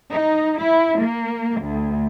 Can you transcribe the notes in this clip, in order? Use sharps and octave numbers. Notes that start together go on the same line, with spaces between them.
D#4
E4
A#3
D2